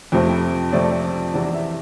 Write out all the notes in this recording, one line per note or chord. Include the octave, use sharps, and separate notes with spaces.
F2 C3 F3 A3 C4
F2 C3 F3 A3 C4 D5
E2 C3 E3 D5
E5